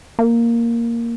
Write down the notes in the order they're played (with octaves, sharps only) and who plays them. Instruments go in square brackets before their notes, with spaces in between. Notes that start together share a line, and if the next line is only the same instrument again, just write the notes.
[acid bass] A#3